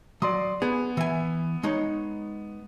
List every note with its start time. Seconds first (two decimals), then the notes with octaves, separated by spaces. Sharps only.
0.22 F#3 D5 C6 D#6
0.62 B3 G#4
0.97 E3 G#5
1.63 G#3 D#4 C#5